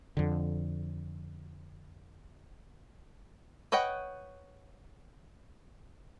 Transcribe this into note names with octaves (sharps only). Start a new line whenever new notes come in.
F2 D3
B4 C#5 D#5 F#5 G5